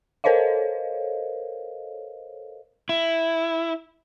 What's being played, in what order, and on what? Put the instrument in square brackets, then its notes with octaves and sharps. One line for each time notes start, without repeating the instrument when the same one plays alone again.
[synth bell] A4 A#4 C5 C#5 D#5 F5
[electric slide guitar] E4